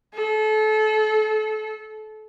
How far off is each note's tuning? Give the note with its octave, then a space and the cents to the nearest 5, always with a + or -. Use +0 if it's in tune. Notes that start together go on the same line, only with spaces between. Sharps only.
A4 -30